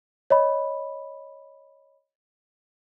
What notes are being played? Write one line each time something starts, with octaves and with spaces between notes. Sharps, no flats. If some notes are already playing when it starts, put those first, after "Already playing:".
C#5 D#5 B5